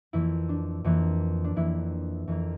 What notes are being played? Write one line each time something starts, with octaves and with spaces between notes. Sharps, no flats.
F2 E3 A#3 E4
D4
F2 E3 A#3
D4
F2 E3 A#3 E4
F2 E3 A#3